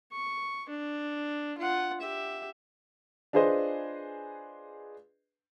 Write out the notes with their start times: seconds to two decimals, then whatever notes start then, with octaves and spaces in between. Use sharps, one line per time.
0.12 C#6
0.69 D4
1.58 F4 F#5
2.01 G4 E5
3.33 D4 F4 G#4 B4 C5 D#5